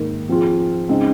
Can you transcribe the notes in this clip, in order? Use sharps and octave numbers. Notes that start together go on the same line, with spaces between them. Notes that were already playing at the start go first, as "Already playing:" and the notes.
Already playing: G#2 D#3 A#3
F3 C4 F4 G#4
C#3 G#3 C4 D#4